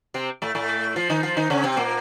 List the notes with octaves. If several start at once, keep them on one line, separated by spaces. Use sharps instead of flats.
C3 C4
A2 A3
A2 A3
F3 F4
D#3 D#4
F3 F4
D#3 D#4
C#3 C#4
C3 C4
A#2 A#3